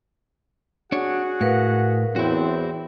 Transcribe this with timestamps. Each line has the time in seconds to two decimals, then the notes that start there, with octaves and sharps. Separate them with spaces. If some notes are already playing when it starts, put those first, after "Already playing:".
0.92 D4 F#4 G#4 C#5 F#5
1.41 A2 A#4 B4 F5
2.16 E2 C4 E4 F#4 C#5